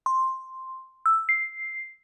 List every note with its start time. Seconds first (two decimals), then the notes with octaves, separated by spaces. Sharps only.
0.06 C6
1.06 E6
1.29 C7